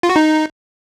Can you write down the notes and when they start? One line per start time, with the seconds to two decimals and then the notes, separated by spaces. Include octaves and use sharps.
0.03 F4
0.10 F#4
0.16 D#4